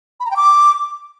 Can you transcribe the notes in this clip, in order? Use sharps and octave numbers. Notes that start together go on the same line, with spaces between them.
B5
A#5
G5
D6